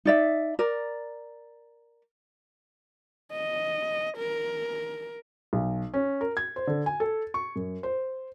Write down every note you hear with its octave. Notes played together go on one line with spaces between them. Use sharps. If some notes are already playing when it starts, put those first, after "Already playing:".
D#4 D5 E5
A#4 D5
D#5
A#4
B1
C#4
A#4
G#6
C5
D3
G#5
A4
C#6
F#2
C5